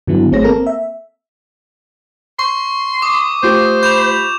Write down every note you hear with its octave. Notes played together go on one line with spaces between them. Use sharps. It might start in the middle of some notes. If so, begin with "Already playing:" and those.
G2 D3 F#3 B3 E4
G#1 A3 C4 G#4 C#5 A#6
A#3 C4 A4 A#4
E5
C6 C#6
D6 D#6
A3 F4 G4 C5
B5 G6 E7 F7